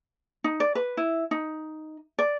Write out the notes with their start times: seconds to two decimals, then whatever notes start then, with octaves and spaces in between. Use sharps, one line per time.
0.44 D#4
0.60 D5
0.75 B4
0.97 E4
1.31 D#4
2.19 D5